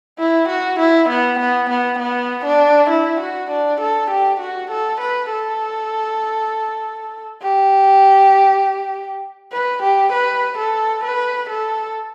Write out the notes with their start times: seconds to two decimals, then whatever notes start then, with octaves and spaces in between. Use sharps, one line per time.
0.19 E4
0.49 F#4
0.80 E4
1.10 B3
1.39 B3
1.70 B3
1.99 B3
2.46 D4
2.90 E4
3.21 F#4
3.51 D4
3.81 A4
4.11 G4
4.40 F#4
4.72 A4
5.01 B4
5.32 A4
7.43 G4
9.53 B4
9.83 G4
10.13 B4
10.58 A4
11.04 B4
11.50 A4